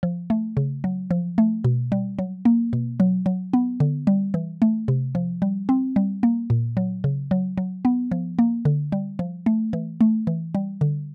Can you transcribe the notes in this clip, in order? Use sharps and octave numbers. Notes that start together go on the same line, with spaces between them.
F3
A3
C#3
F#3
F3
A3
B2
G3
F#3
A#3
B2
F#3
F#3
B3
D3
G3
E3
A3
C3
F3
G3
C4
G3
A#3
A#2
F#3
C#3
F#3
F#3
B3
F3
A#3
D3
G3
F3
A3
E3
A3
E3
G3
D3